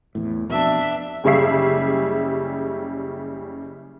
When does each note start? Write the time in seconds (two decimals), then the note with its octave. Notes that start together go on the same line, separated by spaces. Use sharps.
0.15 E2 A2
0.49 F2 B2 D4 E5
1.24 F#1 C#3 G3 G#4 E5 C7